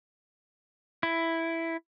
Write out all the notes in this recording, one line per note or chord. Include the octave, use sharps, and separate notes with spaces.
E4